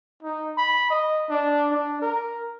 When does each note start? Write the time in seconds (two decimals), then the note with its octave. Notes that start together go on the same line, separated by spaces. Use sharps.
0.23 D#4
0.58 B5
0.90 D#5
1.30 D4
1.70 D4
2.02 A#4